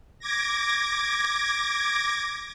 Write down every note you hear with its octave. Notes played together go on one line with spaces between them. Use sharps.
D6 G#6 A#6